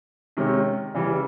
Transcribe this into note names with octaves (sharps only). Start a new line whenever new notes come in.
C3 D#3 G#3 C#4
C#3 E3 G3